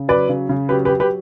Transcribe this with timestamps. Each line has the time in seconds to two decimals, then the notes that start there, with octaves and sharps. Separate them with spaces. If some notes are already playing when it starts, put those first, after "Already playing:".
Already playing: C#3
0.08 F#3 B4 D5
0.29 C#3
0.49 C#3
0.69 F#3 G4 B4
0.85 G4 B4
0.90 F#3
1.00 G4 B4